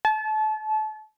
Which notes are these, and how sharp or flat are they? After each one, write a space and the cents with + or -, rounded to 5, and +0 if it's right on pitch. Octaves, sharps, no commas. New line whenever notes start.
A5 -30